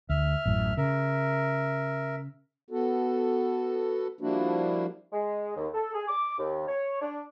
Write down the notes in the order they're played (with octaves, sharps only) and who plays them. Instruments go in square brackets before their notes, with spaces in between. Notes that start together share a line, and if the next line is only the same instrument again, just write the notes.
[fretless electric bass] D2 [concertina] E5 F6
[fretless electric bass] A1 F#2 A2
[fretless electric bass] C#3 [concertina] A#4 E5
[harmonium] B3 F#4 A4
F3 G3 A#3 D4 E4 F#4
[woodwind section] G#3
D#2
A4
G#4
D6
D#2
C#5
D4